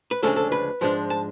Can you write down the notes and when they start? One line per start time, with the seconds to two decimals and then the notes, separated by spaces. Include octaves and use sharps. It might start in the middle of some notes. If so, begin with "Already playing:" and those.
0.11 B4
0.22 D2 C#3 F3 G#3 D4 A4
0.36 A4
0.52 B4
0.81 G#2 F3 G#3 D4
1.10 A5